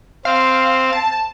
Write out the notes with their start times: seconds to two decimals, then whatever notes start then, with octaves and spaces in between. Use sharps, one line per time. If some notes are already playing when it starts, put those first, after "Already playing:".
0.25 C4 F5
0.93 A5